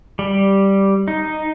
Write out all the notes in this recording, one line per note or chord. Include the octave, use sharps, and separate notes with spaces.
G3
D#4